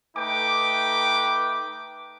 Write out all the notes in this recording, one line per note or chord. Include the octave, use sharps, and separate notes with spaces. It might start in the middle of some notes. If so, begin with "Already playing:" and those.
A3 D#4 B4 G5 D6